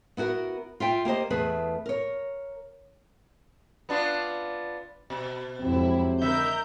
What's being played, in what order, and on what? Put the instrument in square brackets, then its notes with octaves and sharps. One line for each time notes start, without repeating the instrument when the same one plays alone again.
[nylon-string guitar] B3 E4 F#4 A#4
F4 E5 G5
A#3 G4 C5 D#5
E2 A3 G#4 B4
A#4 C#5
[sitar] B3 D4 F4
B2
[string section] F2 G#2 E4 [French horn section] C3 F#3 C4
[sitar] D3 [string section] A#4 G6 [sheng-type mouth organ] E5